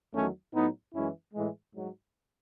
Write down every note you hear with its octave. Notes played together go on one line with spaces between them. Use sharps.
E2 D#3 F#3 A3 C#4
A2 F#3 B3 D#4
F#2 E3 G#3 C#4 E4
A2 E3 G#3
G#2 F#3